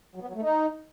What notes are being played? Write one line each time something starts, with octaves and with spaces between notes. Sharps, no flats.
F#3
B3
F#3
A3
D#4